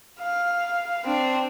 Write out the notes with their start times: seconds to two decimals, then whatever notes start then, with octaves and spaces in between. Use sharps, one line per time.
0.19 F5
1.05 C4 D4